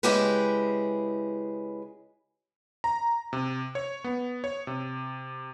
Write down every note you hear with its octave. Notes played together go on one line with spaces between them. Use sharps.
C#3 G#3 E4 G4 G#4 B4
A#5
C3
C#5
B3
C#5
C3